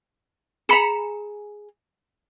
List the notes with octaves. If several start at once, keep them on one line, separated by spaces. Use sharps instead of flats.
G#4 A#5 B5 C#7 E7